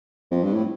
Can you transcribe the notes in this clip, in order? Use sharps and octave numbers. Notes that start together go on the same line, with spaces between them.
F2
G2
A2